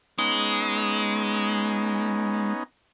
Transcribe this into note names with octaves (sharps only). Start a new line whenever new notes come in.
G#3 B3 C#4 D#4